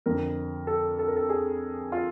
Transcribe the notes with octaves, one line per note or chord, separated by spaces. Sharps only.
F2 D3 F3 A#4
A4
A4
A#4
A4
G#4
F4